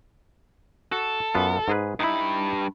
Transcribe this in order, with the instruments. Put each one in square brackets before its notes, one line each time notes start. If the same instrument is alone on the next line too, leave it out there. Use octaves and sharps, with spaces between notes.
[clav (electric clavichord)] F#4 [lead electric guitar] A4
[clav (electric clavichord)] F#2 B3 F4
G#2 G#4 B4
[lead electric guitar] G2 B5 [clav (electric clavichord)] D#4 E4